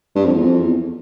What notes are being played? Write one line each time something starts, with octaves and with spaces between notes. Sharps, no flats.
G2
F2
E2
F2
E2